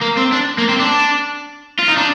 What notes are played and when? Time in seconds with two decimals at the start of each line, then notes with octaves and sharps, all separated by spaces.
0.02 A#3
0.17 C4
0.32 D4
0.58 A#3
0.69 C4
0.80 D4
1.79 F4
1.88 D#4
1.98 D4